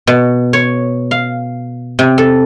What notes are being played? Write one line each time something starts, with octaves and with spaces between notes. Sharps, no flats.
B2
C#5
F5
C3
A4